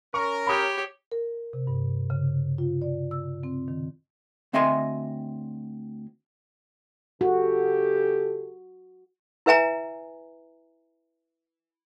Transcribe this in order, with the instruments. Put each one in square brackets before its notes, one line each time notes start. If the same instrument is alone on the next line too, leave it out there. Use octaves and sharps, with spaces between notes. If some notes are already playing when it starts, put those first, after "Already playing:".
[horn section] C#4 A#4 [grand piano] C#6
[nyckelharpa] G4 C#5 [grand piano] B5 D#6 G6
[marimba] A#4
C3
G2
C#3
F4
D5
E6
C4
D#3
[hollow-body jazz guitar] D2 C4 D#5 E5 G#5 C6
[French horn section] C#3 G4 A4 [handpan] F#4
[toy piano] E4 B4 E5 G#5 A#5